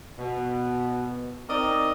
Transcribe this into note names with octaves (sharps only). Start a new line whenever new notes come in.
B2
C4 D#4 A#4 D5 D#5